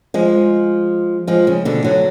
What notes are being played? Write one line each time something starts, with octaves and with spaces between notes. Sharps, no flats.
F3 G#3
F3 G#3
C#3
B2 D3
D3 F#3